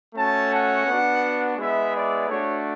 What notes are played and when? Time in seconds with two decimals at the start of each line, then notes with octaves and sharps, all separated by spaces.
0.15 A3 C#4 F#4 A5
0.51 F#5
0.87 B3 D4 F#4
1.57 G#3 B3 E4 E5
1.93 D5
2.29 A3 D4 F#4 C#5